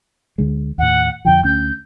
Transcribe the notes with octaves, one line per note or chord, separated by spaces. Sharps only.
D2 D3 G#3
D#2 A2 F#5
F2 D3 F3 G5
D2 C#4 G6